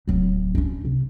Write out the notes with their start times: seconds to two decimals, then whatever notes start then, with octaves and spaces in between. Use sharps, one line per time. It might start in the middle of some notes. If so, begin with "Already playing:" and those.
0.08 D1 F#3
0.55 C#4 D4
0.85 C3